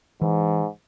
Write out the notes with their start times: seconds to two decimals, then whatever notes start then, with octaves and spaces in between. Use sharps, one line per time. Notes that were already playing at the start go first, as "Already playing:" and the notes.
0.22 G#2 E3